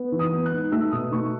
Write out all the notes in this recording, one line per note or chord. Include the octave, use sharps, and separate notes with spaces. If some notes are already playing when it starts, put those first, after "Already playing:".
Already playing: B3
E3
D#6
B3
F#6
G#2
A3 E6
B2 D#6
A3 C#6